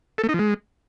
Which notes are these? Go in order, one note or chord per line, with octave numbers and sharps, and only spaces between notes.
A4
A3
D#4
F3
G#3